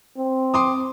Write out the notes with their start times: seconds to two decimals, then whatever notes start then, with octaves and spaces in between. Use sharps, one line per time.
0.18 C4
0.54 C6 D6 D#6